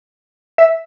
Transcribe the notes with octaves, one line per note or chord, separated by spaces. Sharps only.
E5